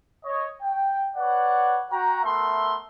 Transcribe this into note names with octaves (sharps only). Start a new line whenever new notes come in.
C#5 D#5
G5
B4 C#5 D5 F#5
F#4 G5 A#5
A3 B3 A#4 E5 A5 C6